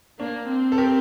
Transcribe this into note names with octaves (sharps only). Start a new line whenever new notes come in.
A#3 D4
C4
A4
G4 A#4